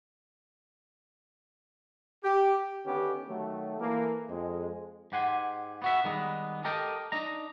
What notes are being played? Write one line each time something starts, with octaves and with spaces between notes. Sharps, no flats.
G4
D3 D#3 B3 C#4 G4
D#3 F#3 A3
E3 A3 A#3
F2 G#3
G#2 G4 F#5 G#5 C6
B3 F#4 E5
D#3 G3 G#3 B3 D#4
G4 A4 A#4 D#5 G5
D4 D#4 A#5